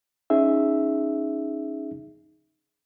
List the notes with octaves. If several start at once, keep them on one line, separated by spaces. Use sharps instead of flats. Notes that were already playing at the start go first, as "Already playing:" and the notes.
C#4 D#4 G#4 E5